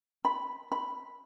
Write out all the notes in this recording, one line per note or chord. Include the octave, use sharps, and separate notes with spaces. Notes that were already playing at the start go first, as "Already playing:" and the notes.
B5
B5